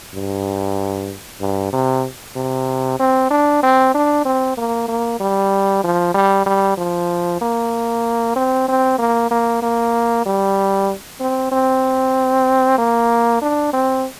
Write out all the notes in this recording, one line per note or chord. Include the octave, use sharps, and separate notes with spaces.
G2
G2
C3
C3
C4
D4
C4
D4
C4
A#3
A#3
G3
F3
G3
G3
F3
A#3
C4
C4
A#3
A#3
A#3
G3
C4
C4
A#3
D4
C4